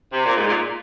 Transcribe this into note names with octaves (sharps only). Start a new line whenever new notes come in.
C3
A#2
G#2
A#2